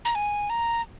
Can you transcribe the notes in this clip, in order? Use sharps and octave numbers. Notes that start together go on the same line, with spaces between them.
A#5
G#5
A#5